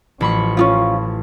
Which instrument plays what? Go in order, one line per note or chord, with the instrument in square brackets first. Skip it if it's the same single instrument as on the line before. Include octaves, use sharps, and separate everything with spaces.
[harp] A1 B5 C#6 [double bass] F3
[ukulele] C#4 D#4 F4